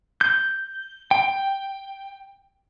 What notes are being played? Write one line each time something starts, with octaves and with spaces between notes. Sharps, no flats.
G6
G5